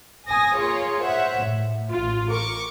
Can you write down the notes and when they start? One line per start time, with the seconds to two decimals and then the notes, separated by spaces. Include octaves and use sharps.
0.28 G#5 D#6 A#6
0.56 A#3 F4 G#4 C#5
1.04 C5 C#5 E5 F#5
1.43 A2
1.92 A1 F4
2.31 A#4 C#6 D6